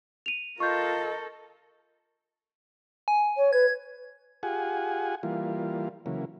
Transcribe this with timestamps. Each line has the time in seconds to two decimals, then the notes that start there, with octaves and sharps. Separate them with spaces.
0.26 D#7 F7
0.60 F4 A4 A#4 D#5 C#6 G6
3.08 G#5
3.37 C#5
3.53 B4 G#6
4.43 F4 G4 G#4 F#5 G#5
5.23 E3 G3 A#3 F4
6.06 C#3 E3 F#3 A#3